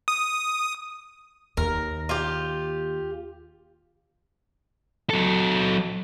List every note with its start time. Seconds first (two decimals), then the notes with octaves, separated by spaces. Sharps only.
0.08 D#6
1.57 D#2 A#4
2.09 F4 G4
5.10 F#3 A4